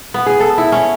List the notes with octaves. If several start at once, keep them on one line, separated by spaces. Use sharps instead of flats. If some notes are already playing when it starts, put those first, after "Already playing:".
B3
G#4
A4
E4
C#4